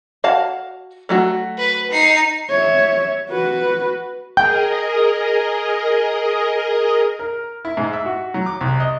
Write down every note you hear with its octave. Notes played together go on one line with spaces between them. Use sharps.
F#4 F5 A5
F#3 A3 F#4
B4
D#4 C7
C#5 E5
F#4 B4
G#4 A#4 D#5 G5
A#4
E4
G#2
E5
F#4
F#3
D6
C2
D#5